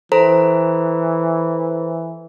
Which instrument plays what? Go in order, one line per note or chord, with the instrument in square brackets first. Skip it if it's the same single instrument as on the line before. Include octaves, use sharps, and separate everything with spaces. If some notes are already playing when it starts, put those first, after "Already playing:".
[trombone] E3 [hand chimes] A4 C5 A#5